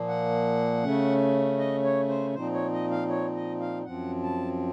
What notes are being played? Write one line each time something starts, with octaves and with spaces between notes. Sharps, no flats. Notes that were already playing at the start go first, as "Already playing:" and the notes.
Already playing: A#2 F3 A#3
F#5
C#3 A3 C#4
D#5
C#5
C5
A#2 F3 C4 D#4 C5
C#5
D#5
F5
C#5
D#5
F5
F#2 F3 C4 F#5
A5